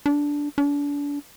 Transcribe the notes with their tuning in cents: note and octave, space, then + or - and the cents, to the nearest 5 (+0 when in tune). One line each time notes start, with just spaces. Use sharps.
D4 -10
D4 -35